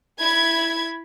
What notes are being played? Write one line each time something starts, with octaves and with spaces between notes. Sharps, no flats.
E4 B5 G#6